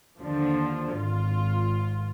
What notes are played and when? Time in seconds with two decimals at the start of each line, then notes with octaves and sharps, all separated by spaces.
0.20 D#2 D3 F3
0.94 G#1 F4